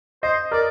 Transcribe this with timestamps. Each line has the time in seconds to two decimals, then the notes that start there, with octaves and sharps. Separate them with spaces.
0.23 C5 D#5
0.51 A#4 D5